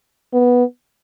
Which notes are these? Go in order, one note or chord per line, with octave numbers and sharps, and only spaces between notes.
B3